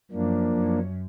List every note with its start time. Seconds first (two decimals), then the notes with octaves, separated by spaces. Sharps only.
0.11 F#2 F3 A#3 D4
0.54 F#2